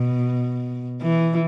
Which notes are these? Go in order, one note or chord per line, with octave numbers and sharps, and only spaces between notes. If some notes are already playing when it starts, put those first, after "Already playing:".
Already playing: B2
E3